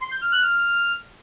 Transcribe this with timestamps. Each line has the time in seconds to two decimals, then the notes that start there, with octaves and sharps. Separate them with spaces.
0.01 C6
0.12 G6
0.22 F6
0.32 F#6
0.42 F6